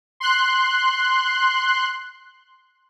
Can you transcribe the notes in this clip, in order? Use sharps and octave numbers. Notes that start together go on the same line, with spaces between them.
C6 F#6